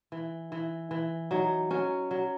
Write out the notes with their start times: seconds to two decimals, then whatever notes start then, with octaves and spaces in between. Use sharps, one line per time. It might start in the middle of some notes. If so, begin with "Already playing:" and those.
0.12 E3
0.52 E3
0.91 E3
1.31 F#3 D#4
1.71 F#3 C#4
2.11 F#3